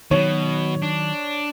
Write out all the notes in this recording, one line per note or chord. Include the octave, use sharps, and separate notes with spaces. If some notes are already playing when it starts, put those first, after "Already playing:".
B2 D#3 F#3 C#5
D4